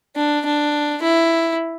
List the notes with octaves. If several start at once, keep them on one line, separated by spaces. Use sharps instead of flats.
D4
D4
E4